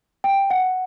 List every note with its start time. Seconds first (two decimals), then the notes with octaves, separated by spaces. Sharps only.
0.24 G5
0.50 F#5